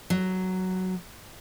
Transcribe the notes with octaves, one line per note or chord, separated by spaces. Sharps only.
F#3